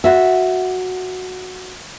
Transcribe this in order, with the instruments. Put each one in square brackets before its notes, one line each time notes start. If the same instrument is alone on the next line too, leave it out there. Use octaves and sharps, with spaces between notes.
[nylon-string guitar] F#4 E5